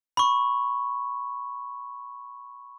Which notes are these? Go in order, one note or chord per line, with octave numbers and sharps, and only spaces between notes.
B5 C#6